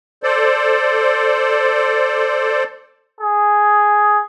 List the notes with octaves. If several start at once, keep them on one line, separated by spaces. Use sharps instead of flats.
A4 C5 D5
G#4